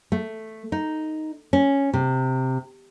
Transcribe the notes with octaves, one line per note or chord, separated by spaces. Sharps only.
A3
D#4
C#4
C3